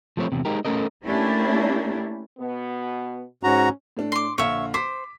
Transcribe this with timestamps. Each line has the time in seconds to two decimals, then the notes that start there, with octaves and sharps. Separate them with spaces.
0.17 F3 A3 C4 C#5
0.32 E2 C3
0.45 G#3 D#4 G4 A#4
0.65 A3 C#4 A4 A#4 D#5
1.05 A3 A#3 C#4 D4 E4 G4
2.39 B2 B3
3.43 G#2 C#4 F#4 A#5
3.97 A2 A3 D4
4.12 C6 D6
4.38 A#1 D3 C#5 E5 F5
4.74 C5 D6 B6